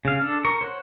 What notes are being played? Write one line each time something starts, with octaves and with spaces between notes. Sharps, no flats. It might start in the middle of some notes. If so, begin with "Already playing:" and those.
C#3 F5
D4 A4
A#4 C#6
C5 C#5 F#5